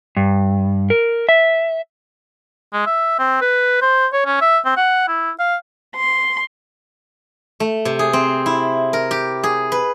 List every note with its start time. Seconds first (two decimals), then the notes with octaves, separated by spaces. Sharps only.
0.17 G2
0.90 A#4
1.29 E5
2.73 G#3
2.86 E5
3.19 C4
3.41 B4
3.81 C5
4.13 C#5
4.26 C#4
4.41 E5
4.65 C4
4.77 F#5
5.08 E4
5.39 F5
5.96 C6
7.60 A3
7.85 C3
7.99 G#4
8.13 C4
8.46 E4
8.93 A#4
9.11 G4
9.43 G#4
9.72 B4